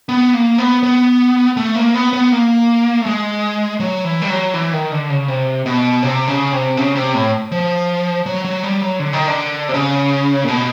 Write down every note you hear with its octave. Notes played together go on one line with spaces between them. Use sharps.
B3
A#3
B3
B3
A3
A#3
B3
B3
A#3
A3
G#3
F#3
E3
G3
F#3
E3
D#3
D3
C#3
C3
B2
C3
C#3
C3
C#3
C3
A2
F3
F#3
F#3
G3
F#3
D3
D#3
D3
C3
C#3
A#2
B2